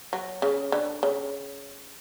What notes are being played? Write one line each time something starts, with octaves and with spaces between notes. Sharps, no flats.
F#3
C#3
D3
C#3